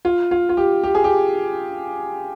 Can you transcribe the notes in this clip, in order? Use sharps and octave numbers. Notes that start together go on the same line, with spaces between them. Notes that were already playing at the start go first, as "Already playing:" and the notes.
F4
F4
F4
G4
G4
G#4
G4